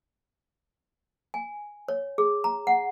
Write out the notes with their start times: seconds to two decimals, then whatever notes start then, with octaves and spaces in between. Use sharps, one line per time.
1.34 G#5
1.88 C#5
2.18 G#4
2.44 A#5
2.67 F#5